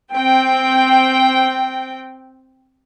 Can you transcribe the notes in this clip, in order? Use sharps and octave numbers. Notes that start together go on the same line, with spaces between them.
C4 G5